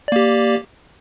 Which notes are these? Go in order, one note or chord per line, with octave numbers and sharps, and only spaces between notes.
A#3 G4 D5